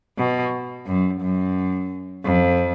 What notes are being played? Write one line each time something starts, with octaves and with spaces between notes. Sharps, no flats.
B2
F#2
F#2
F2